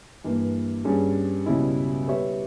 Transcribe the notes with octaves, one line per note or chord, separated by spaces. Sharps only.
G2 E3 A#3
G2 G3 C#4 G#4
C#2 B2 G3 C#4 E4
G3 B3 G4 C#5 E5